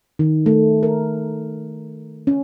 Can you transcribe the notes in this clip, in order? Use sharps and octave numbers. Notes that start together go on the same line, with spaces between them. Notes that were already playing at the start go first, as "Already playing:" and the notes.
D#3
A3
A#4
C#4